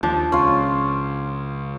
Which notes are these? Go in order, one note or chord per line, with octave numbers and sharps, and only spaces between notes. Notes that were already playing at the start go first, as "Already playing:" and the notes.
D#2 F3 D4
C#2 C#4 F4